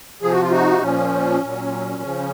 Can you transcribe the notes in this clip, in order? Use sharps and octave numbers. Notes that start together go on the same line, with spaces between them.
C3 F3 G#4
F#4
F4
D#4 F#4
A#2 F3 C#4
A#2 F#3
C#3 F3